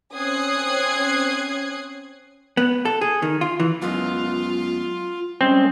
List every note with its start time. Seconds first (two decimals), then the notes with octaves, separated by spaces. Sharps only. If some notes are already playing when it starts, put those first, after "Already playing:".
0.13 C4 C#4 D#6 F#6 G#6 C7
2.57 B3
2.85 A4
3.01 G#4
3.22 D#3
3.41 F4
3.60 E3
3.82 F#2 G#3 B3 F4
5.41 G3 G#3 C4 C#4